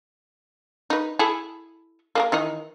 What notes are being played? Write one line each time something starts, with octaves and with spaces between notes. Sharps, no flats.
D#4 B4
E4 G#4 A4
A#3 G#4 A#4
D#3 E3 D#4